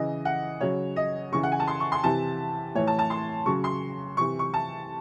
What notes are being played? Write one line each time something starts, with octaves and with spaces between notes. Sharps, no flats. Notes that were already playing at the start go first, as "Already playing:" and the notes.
Already playing: C#3 E3 D#5
F#5
C#3 F#3 C#5
D#5
C#3 E3 C#6
F#5
G#5
A5
C6
C#6
C6
C3 E3 A5
A2 E3 C#5
A5
A5
C6
C#3 F#3 C#6
C6
C3 E3 C#6
C#6
A5